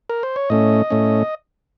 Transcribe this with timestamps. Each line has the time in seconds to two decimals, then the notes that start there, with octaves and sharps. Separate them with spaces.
0.10 A#4
0.23 C5
0.36 C#5
0.50 A2 A3 C#4 D#5
0.90 A2 A3 C#4